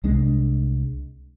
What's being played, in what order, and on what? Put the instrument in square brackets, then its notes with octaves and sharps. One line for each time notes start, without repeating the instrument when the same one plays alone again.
[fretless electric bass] C2 G#3 D4